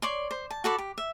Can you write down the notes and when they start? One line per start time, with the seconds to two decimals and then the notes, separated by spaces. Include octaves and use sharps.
0.02 C#5 D5 C6
0.31 C5
0.50 A5
0.64 F#4 A4 D5 B5
0.78 G4
0.98 E5